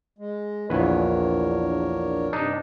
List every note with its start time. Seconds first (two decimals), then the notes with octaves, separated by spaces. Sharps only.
0.18 G#3
0.69 A#1 E2 D4 A#4 B4 C#5
2.33 G2 C3 D4 D#4